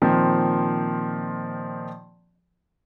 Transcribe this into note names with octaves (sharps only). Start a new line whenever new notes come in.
A#2 D#3 F3 C4